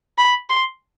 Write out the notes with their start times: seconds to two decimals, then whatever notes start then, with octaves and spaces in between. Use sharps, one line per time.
0.18 B5
0.50 C6